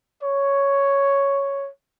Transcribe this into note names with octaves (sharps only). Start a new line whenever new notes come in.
C#5